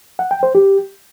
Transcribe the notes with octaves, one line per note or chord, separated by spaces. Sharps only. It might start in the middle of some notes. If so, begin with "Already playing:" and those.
F#5
G5
C5
G4